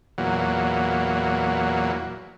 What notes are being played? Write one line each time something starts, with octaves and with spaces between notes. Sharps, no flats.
E2 A#2 F#3